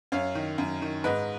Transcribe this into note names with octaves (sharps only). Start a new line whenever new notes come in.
F#2 C#5 F5
D#3
F#2
D#3
G#2 B4 D#5